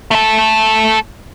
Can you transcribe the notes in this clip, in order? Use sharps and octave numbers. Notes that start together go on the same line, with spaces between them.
A3 A4